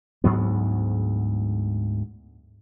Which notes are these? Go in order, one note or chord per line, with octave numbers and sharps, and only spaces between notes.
D2 G#2 F#3 B3